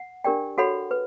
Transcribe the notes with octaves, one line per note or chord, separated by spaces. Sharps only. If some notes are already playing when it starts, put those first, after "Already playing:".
Already playing: F#5
D4 G4 A#4 D5 G5
F#4 A4 C#5 F#5 B5
B4